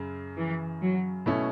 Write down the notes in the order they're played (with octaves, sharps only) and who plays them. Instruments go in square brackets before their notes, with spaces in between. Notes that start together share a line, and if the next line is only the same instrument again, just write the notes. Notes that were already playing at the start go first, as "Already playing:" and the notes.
Already playing: [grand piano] F#2 C#3
[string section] E3
F#3
[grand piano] B2 A3 C#4 E4